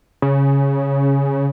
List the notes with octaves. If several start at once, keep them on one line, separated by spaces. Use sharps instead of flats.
C#3